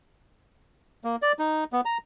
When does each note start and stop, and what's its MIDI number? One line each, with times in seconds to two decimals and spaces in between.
1.04 1.16 58
1.22 1.32 74
1.39 1.64 63
1.73 1.81 59
1.85 1.98 82